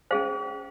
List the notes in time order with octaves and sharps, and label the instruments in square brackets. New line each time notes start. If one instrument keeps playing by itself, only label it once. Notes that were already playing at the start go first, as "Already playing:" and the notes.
[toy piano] C#4 G#4 C5 F5